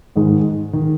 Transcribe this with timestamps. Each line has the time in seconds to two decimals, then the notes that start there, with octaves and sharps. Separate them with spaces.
0.16 G#2 D#3 G#3 D#4
0.73 D#3